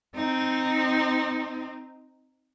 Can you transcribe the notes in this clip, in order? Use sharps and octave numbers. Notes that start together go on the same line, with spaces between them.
C4 D#4